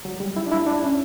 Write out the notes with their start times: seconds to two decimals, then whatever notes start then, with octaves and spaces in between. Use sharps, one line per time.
0.05 F#3
0.20 G3
0.36 E4
0.46 D4
0.51 E4
0.67 D4
0.83 C#4